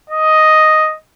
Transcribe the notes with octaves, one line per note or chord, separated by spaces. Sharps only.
D#5